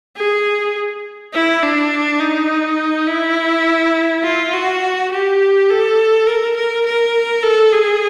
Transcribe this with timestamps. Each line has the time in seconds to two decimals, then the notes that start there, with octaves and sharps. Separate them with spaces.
0.17 G#4
1.33 E4
1.63 D4
2.20 D#4
3.07 E4
4.24 F4
4.53 F#4
5.12 G4
5.70 A4
6.27 A#4
6.56 A#4
6.86 A#4
7.43 A4
7.73 G#4